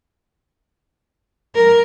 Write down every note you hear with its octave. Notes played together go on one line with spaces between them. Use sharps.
A#4